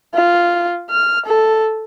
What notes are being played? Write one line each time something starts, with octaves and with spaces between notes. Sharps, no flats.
F4
F6
A4